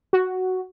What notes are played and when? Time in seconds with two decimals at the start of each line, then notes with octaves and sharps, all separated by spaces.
0.13 F#4